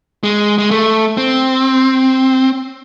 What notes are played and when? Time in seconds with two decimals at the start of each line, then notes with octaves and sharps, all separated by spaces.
0.24 G#3
0.58 G#3
0.71 A3
1.17 C4